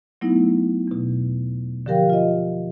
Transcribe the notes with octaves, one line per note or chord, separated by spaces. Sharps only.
F#3 A3 B3 D#4 E4
E2 B2
D3 F3 G4 A#4 F5 G5
F4 D#5